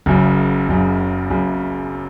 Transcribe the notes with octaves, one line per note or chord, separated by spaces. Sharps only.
F#1 F#2 C#3
F#1 F#2 C#3
F#1 F#2 C#3